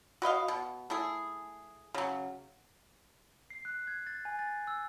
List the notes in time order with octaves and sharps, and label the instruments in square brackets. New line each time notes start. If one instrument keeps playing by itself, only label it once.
[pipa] F#4 B4 D#5 F5
B2
A3 E4 G#4
C#3 F#3
[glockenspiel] C7
F#6
G#6
A6
G#5
A6
E6